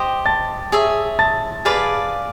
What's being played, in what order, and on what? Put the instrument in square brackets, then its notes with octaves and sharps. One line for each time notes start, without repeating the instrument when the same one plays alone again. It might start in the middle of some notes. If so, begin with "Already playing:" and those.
Already playing: [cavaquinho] G4 C5 D#5
[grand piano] A5 A6
[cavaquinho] G#4 C#5 E5
[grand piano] A5 A6
[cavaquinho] G#4 B4 D5 F5